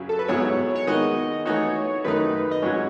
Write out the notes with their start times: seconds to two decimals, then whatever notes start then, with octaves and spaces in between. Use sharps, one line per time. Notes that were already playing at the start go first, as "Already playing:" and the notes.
Already playing: F#2 C#3 F#3 C#4
0.09 A4
0.19 B4
0.28 G#2 F#3 B3 E4 C#5
0.75 C#5
0.87 D#3 G#3 B3 D#4 F#4 D#5
1.45 E3 A3 D#4 F#4 C#5
2.04 F#2 D#3 A3 D#4 B4
2.51 D#5
2.62 G#2 F#3 C#4 F#4 C#5